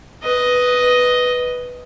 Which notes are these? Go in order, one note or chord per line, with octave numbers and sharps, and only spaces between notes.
B4 D#5